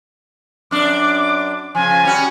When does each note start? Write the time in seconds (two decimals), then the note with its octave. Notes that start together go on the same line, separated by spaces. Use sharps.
0.71 F#2 D4 D6
1.75 C#3 F3 G#5
2.03 G3 C#4 F#4